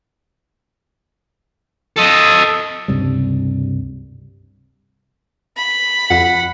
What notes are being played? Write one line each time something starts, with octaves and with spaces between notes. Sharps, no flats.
A4 D#5
C#2 G2 C3 G3
B5
F2 F#5